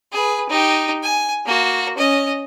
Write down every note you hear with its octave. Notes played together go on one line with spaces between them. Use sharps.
G#4 B4
D#4 G4
G#5
A#3 F#4
C#4 D#5